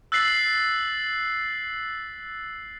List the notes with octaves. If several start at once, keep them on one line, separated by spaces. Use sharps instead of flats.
E6 F#6 A6 B6 C7 F#7